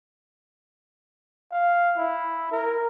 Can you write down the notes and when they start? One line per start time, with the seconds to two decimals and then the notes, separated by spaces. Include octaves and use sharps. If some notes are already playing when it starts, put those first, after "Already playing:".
1.51 F5
1.96 E4
2.51 A#4